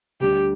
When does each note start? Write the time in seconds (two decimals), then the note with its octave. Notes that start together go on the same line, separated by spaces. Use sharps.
0.20 D2 D3 G3 D4 G4